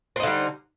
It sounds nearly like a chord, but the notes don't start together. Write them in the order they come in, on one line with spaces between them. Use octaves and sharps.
C4 D#4 D3 G3